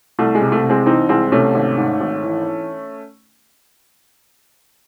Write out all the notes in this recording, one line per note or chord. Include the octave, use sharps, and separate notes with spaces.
C2 A3
G#3
C3
A3
C2
G#3 C4
E3 C4 D#4
C2 G#3 C4
C3 A3 C#4
G#1
G#2
G#1
E3